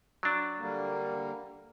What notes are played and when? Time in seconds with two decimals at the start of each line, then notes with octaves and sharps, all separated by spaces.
0.23 F#3 D4
0.58 D3 G3 A#3